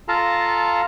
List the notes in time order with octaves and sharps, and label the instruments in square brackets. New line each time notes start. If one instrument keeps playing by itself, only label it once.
[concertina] F4 A4 F5 A5 A#5